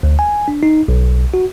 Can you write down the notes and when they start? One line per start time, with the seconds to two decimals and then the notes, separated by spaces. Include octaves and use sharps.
0.03 D2
0.19 G#5
0.48 D4
0.63 D#4
0.88 B1
1.34 F#4